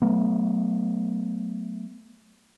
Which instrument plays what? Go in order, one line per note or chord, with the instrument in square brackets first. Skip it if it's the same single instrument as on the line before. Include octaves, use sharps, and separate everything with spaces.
[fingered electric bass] F#3 A3 B3